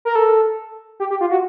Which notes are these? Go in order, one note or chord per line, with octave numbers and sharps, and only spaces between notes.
A#4
A4
G4
G4
F4
F#4